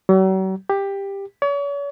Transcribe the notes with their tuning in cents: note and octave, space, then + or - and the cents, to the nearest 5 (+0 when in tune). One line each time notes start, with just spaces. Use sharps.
F#3 +45
G4 +15
C#5 +40